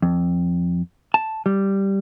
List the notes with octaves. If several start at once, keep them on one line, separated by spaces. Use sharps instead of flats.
F2
A5
G3